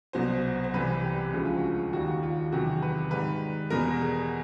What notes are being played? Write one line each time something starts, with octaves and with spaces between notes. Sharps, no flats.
C2 B2 F#3 C5
C5
C2 C3 E3 G3 B4
G4
D2 C#3 F3 G#3 F#4
F4
F#4
D#2 D#3 G3 F#4
F#4
F4
E2 C3 D#3 F#3 F#4
B4
G#2 D#3 G3 B4
E2 B2 G3 A#4
G#4